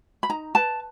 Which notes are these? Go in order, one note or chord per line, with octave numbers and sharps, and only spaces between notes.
B5
D#4 A#5
B4 A5